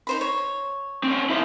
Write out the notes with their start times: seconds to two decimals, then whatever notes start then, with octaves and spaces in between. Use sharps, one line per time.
0.07 D#4 C5 B5
0.21 C#5
1.03 C4 C#4
1.30 E4 C5